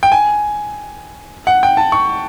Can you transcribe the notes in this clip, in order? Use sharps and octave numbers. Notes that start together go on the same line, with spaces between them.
G5
G#5
F#5
G5
A5
C#6